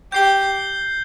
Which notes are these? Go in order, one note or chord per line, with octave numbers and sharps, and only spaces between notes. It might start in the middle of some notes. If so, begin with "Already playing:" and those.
G4 G6 C7 G7